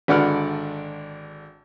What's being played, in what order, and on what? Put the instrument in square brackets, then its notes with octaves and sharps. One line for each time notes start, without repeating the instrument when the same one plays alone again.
[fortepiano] G#1 D3 D5 F#5 B5 F6